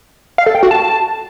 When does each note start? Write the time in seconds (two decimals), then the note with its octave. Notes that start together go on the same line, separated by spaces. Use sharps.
0.38 F5
0.46 A4
0.55 G5
0.63 F#4
0.71 A5